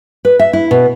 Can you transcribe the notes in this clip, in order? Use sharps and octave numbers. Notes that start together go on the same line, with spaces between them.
B4
E5
E4
B2